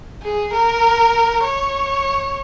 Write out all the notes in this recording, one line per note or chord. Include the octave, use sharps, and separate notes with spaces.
G#4
A#4
C#5